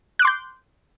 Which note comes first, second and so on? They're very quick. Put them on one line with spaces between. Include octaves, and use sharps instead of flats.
F#6 D6 C6 G6